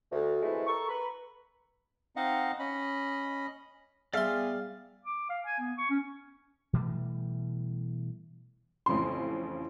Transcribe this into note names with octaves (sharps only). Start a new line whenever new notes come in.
D2
C3 E3 G#3 A3 E4
A4 A#4 C#6
B4 A#5 B5
C4 D#4 D#5 F5 F#5
C#4 D#5 B5
G3 B3 G#4 D5 E5 F5 C6 F6
D6
F5
G#5
B3
C#6
C#4
B2 E3 G3 A3
A1 F2 C#3 C6